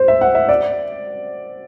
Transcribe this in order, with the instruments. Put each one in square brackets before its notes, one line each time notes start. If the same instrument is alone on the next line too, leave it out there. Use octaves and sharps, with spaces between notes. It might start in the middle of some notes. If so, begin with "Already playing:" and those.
Already playing: [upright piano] C5
E5
F#5
E5
D5